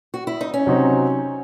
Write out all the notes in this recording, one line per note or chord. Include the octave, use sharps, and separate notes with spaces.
F#4
E4
D#4
C#4
C3 F#3 C4 D#4 F#4